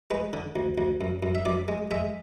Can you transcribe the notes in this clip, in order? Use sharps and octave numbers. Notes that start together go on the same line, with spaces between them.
G#3 B4
D3
D2
D2
F#2
F#2
E5
F#2 D5
G#3
G#3 E5